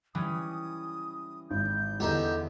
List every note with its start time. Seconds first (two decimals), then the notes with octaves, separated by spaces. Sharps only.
0.15 E3 G3 C#4 D#6
1.51 G#1 G6
2.00 E2 D3 D#4 G4